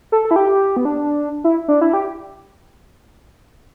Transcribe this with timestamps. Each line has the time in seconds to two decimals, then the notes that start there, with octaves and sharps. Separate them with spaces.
0.12 A4
0.25 A4
0.31 E4
0.36 G4
0.77 B3
0.85 D4
1.44 E4
1.68 D4
1.81 E4
1.93 G4